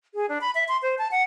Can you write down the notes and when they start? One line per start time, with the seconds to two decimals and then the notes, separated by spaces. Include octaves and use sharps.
0.14 G#4
0.29 D4
0.41 B5
0.55 E5
0.68 C6
0.82 C5
0.98 A5
1.11 F#5